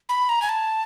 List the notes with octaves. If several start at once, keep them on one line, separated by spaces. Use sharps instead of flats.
B5
A#5
G#5
A5